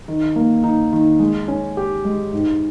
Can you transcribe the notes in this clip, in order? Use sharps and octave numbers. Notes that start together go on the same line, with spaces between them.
D#3
A#3
D#4
D#3
G#3
C#4
G4
G#3
G#2